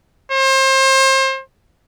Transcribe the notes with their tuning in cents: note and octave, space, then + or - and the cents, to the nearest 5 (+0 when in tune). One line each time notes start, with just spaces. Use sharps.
C5 +30